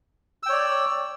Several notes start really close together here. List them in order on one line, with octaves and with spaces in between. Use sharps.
E6 G5 C#5 D5